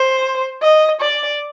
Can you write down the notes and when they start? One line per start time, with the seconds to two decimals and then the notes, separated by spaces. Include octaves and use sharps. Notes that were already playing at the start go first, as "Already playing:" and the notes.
Already playing: C5
0.62 D#5
1.01 D5